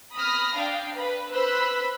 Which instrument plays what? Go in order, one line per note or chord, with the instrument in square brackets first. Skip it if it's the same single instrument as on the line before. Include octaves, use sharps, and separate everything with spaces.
[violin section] B5 D#6 F6 A#6
D4 F5 G5
B4 B5
B4 C5 B5 E6 F#6